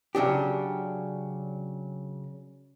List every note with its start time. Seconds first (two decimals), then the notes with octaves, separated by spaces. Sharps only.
0.15 C#3 F#3 D4 G4